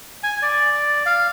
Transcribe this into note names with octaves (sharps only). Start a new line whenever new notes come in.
G#5
D5
F5